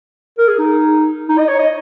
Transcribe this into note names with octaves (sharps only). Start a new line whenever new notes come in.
A#4
G#4
D#4
D#4
D#5
C#5
D#5